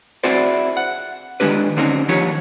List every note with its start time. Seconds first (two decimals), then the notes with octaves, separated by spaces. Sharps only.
0.23 C4 E4 F#4 G#4 C5 D5
0.77 F#5
1.40 D#3 G#3 D4 G4 B4
1.76 D3 A#3 C4 C#4 D#4
2.09 D#3 F3 G4 C#5